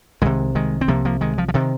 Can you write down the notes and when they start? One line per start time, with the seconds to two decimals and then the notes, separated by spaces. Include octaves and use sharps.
0.22 C2 C3 D#3 G#3
0.55 D#3 G#3
0.81 C4
0.88 C2 C3 F3 A#3
1.05 F3 A#3
1.21 D#3 G#3
1.38 F3
1.49 F3
1.54 C3 D#3